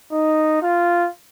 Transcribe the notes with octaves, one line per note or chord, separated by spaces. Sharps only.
D#4
F4